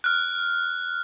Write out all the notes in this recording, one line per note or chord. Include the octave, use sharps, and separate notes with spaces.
F6 F#6